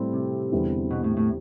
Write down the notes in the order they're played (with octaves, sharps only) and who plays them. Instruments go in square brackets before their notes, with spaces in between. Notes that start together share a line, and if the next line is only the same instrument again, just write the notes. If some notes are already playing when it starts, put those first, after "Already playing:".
Already playing: [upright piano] A2 G3 C4 E4 A4
[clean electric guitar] C3
[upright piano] E2 D3 G3 C4 E4
[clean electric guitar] B2
A2
A2